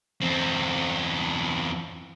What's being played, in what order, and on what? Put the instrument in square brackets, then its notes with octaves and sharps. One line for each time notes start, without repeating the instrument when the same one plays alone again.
[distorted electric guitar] E2 C4